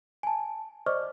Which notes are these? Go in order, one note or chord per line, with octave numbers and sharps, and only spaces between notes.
G#5 A5
C5 D5 D#5 C#6 D6 F6